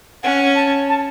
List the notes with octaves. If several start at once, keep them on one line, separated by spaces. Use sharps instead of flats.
C#4 F#5
A5
A5